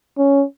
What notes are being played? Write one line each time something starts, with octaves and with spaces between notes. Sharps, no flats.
C#4